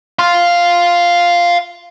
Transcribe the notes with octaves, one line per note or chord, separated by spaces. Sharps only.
F5 C6